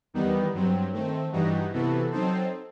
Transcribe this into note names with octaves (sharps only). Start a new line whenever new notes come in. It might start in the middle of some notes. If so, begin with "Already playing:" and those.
E2 D#3 G3 B3 D#4
G2 F#3 C4
D#3 A3 C4
G2 E3 G3 D#4 F#4
C3 E3 B3 F#4 A4
F#3 C4 D#4 A4 C5